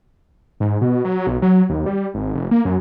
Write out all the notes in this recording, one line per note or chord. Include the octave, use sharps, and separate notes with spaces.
G#2
B2
F#3
B1
F#3
D#2
G3
G#1
F1
A#3
F#2